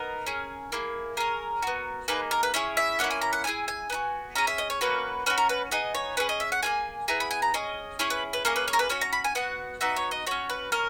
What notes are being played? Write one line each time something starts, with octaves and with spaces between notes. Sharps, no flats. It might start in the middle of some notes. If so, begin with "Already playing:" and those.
Already playing: B3 D#4 A#4
C#4 G#4
A#3 E4 G#4
C#4 G#4 A#4
B3 F#4
A#3 D#4 G#4 B4
A#4
B4
C#4 E4 G#4 C#5
E5
A#3 C#4 E4 F#5
G#5
A#5
F#5
B3 E4 G#4 G#5
G#5
B3 D#4 F#4
C#4 G#4 A#5
E5
D#5
C#5
A#3 C#4 F#4 B4
C#4 F#4 B4
A#4
B4
B3 D#4 G#4 D#5
C#5
C#4 G#4 B4
D#5
E5
F#5
A#3 C#4 G#4 G#5
B3 E4 G#4 A#5
B5
G#5
A#5
C#4 G#4 D#5
C#4 E4 G#4 C#5
B4
B4
A#3 C#4 G#4 A#4
B4
C#5
A#4
B4
C#4 F#4 C#5
A#5
B5
G#5
B3 F#4 F#5
B3 D#4 F#4 E5
C#5
D#5
C#4 F#4 C#5
B4
C#4 A#4